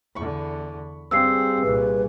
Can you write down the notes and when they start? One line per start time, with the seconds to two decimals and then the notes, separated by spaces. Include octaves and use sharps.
0.15 E2 D3 B5 C#6
1.11 G2 C4 G#4 C6 E6 C7
1.62 C2 A#2 B4